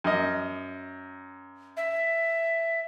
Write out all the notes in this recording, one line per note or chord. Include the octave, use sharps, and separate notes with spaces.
F#2 D#5
E5